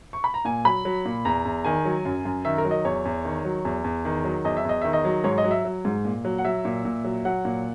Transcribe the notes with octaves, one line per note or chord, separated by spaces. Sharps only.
C#6
B5
A#5
A#2 G#5
F#3 B5
F#3
A#2
E2 A#5
E2
D#3 G#5
F#3
F#2
F#2
D#3 E5
A#4
F#3
D#5
E2 C#5
E2
D#3
F#3
E2
E2
D#3
F#3
E2 D#5
E5
E2 D#5
D#3 E5
D#5
F#3
G#2 C#5
D#5
F#3
E5
F#3
G#2
A#2
F#3
F#5
F#3 E5
A#2
A#2
F#3
F#3 F#5
A#2